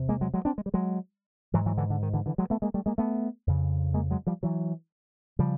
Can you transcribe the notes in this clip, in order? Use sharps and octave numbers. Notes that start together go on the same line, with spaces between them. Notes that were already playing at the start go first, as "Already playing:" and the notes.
Already playing: E2 C3
G#3 A#3
F#3 G#3
F#3 G#3
C4 D4
G#3
G3
F#3 G#3
G#2 E3 F#3
E3 F#3
D3 E3
D3
D#3
D3 E3
D3 E3
F#3 G#3
A3 B3
G#3 A#3
G3 A3
G#3 A#3
A3 B3
F2 C#3
G#3 A#3
F#3 G#3
F3 G3
E3 F#3
C#3 F3 G3